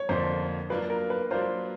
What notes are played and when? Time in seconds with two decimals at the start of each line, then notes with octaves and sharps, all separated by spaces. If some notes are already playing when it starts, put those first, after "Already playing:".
Already playing: C#5
0.09 F2 D3 F3 A#3 D4 C5
0.70 F#3 A#3 D4 F4 B4
0.90 A#4
1.10 B4
1.30 F#3 A#3 D4 F4 C5